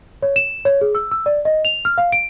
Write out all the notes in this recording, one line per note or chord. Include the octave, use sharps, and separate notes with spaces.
C#5
E7
C#5
G#4
E6
E6
D5
D#5
F7
F6
F5
D7